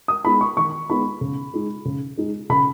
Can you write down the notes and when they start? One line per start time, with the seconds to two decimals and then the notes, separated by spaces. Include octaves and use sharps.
0.08 D#6
0.25 G#3 B3 D#4 B5
0.41 C#6
0.57 D#3 C#6
0.89 G#3 B3 D#4 B5
1.21 C#3
1.54 G#3 D#4
1.85 C#3
2.17 G#3 D#4
2.50 C#3 B5